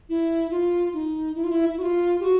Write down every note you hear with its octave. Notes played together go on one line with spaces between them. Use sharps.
E4
F4
D#4
E4
F4
E4
E4
F#4
F4
G4
F#4